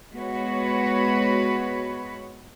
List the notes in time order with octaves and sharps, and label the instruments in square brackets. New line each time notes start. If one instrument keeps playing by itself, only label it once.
[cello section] G#3 B3 F#4 B4 C#5